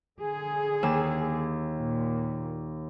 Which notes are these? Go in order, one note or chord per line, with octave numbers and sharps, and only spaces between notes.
D3 G#4
D#2 E6
A#2